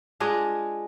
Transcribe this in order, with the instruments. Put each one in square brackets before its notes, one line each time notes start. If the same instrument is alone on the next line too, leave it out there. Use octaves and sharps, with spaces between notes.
[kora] G#3 D4 F4 G#4